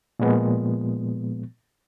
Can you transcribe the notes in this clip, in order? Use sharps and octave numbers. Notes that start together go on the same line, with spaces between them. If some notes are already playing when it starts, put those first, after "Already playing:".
A#2 F3 G#3 B3